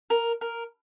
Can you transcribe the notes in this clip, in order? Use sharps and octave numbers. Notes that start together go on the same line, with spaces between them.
A#4
A#4